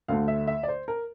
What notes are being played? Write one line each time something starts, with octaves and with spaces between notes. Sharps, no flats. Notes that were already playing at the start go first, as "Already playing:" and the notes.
D2 D3 A3 F5
E5
E5
D5
C5
A#4